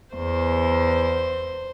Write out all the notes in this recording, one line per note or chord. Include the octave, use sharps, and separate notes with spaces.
E2 C5